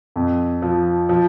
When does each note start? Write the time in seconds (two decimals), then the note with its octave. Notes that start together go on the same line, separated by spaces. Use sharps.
0.16 F2
0.62 F3
1.09 F3